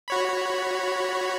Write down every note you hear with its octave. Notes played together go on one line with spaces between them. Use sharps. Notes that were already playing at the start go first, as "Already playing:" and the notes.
F#4 C#5 B5